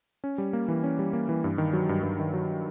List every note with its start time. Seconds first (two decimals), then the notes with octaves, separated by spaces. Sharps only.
0.24 C#4
0.38 G3
0.53 A#3
0.68 E3
0.84 C#4
0.99 G3
1.13 A#3
1.29 E3
1.44 G2
1.58 D#3
1.73 F#3
1.89 G2
2.03 G2
2.19 D#3
2.33 F#3